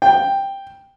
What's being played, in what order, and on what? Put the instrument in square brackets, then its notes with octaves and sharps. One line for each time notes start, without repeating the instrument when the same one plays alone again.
[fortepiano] G5